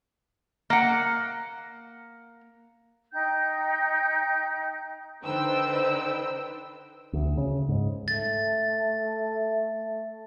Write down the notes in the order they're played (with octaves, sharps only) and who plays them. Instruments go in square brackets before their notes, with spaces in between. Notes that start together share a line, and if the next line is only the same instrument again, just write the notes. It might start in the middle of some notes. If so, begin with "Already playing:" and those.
[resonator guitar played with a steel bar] A#3 F#5
[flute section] D#4 G5 G6
[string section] D3 D#4 B4 C5 G5 E6
[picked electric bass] D2
C#3
G#2
[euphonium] A3 [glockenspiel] A6